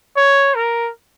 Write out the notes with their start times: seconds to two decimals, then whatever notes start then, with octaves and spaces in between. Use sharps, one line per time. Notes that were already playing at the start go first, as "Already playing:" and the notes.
0.17 C#5
0.55 A#4